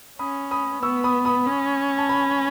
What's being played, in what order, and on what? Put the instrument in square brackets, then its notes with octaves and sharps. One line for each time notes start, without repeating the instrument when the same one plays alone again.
[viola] C#4 [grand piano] B5 D#6
[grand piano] B5 D#6
[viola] B3 [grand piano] C#6 E6
[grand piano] B5 D#6
B5 D#6
[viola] C#4
[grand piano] A5
G#5 B5